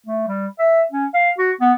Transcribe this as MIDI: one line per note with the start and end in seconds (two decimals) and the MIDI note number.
0.07 0.25 57
0.28 0.47 55
0.59 0.82 76
0.92 1.06 61
1.14 1.30 77
1.38 1.52 66
1.61 1.73 59